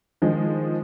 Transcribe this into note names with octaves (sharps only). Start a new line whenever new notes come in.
D#3 F3 G#3